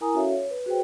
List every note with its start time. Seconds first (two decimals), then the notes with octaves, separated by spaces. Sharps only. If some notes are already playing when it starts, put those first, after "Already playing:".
0.01 E4 A#4 G#5 A#5 D#6
0.14 C#4 F#4 A4 C#5 E5 F5
0.29 C#5
0.50 B4
0.66 F#4 G#4 B4 C5 G5